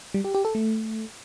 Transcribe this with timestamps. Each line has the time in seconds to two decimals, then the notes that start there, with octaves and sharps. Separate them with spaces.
0.14 G3
0.24 G4
0.35 G4
0.45 A4
0.55 A3